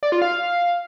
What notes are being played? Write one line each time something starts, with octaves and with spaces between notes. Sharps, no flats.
D5
F4
F5